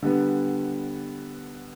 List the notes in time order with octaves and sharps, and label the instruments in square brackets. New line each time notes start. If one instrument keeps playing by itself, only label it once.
[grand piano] D3 G3 B3